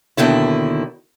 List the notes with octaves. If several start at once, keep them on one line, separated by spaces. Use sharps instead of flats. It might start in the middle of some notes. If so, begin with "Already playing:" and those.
D#2 B2 D3 D#3 E4